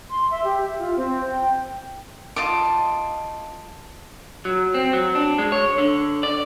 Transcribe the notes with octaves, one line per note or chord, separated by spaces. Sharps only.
C6
E5
G4
E5
F4
C4
G5
F4 D#5 A5 D6
F#3
C4
F#3
D4
G#3
C#5
D3
D5